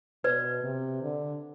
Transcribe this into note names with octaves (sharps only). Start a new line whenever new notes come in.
B2 B4 D5
C3
D3